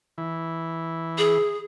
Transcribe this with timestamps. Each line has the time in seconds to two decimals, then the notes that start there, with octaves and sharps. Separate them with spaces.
0.18 E3
1.18 G#4